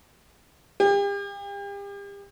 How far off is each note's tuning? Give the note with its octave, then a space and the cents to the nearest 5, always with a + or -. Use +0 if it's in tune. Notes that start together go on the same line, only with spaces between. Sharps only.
G4 +40